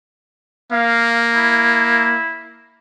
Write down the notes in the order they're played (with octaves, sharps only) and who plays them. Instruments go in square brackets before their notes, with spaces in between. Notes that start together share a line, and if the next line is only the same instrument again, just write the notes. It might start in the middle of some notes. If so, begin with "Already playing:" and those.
[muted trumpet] A#3 [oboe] F5
[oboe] E4